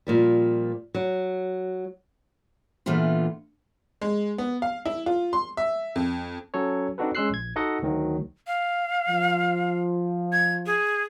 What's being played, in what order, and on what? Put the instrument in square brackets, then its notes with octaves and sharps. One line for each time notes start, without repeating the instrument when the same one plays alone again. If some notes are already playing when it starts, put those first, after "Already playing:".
[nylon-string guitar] A#2 F3 G3
F#3
[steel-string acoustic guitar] A#2 D3 E3 A3 B3 F4
[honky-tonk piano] G#3
B3
F5
E4
F4
C6
E5
F2
[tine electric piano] F#3 C#4 A4 C#5
C4 D4 D#4 F#4 A4 B4
G#3 C#4 C6 E6 F#6 C7
A#1 G#6
D#4 F#4 A4 D#5 F#5
D2 D#3 F#3
[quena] F5
[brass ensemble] F3
[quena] G#6
G#4